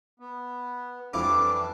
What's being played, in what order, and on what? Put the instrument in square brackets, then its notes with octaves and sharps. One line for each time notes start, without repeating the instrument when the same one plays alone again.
[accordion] B3
[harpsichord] F2 E4 F4 [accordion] E3 G3 D4 [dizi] D6